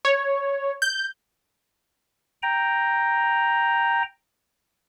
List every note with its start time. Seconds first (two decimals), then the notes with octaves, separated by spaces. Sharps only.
0.05 C#5
0.82 G6
2.43 G5 A#5